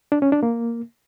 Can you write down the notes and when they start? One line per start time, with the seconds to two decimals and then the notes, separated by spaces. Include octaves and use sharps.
0.12 D4
0.22 C#4
0.32 D4
0.43 A#3